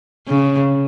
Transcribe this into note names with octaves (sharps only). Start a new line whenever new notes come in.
C#3